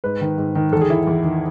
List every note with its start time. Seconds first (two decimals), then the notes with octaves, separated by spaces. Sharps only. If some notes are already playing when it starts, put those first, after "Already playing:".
0.04 G#2 B4
0.21 D#3
0.38 G#2
0.55 D#3
0.72 E2 A4
0.81 G#4
0.90 D#3 E4
1.07 E2
1.24 D#3